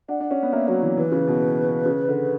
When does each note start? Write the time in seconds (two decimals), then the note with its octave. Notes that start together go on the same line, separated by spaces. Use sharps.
0.09 D4 F#5
0.20 D4
0.31 C#4
0.43 B3
0.53 A#3 E5
0.68 F#3 F#4
0.82 E3
0.97 E3 B4
1.12 C#3
1.27 B2
1.86 C#3
2.08 D3